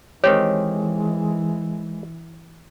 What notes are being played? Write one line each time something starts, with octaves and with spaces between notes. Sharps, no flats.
D#3 E3 G#3 C4 G4 C#5